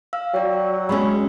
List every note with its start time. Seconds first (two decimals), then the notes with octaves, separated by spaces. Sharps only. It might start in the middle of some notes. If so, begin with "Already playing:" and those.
0.13 F5 E6
0.34 F#3 F#4 D5 G5
0.89 G#3 C#4 B5 C#6 E6